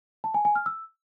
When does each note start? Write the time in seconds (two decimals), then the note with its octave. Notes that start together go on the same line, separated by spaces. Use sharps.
0.24 A5
0.34 G#5
0.45 G#5
0.55 F6
0.66 E6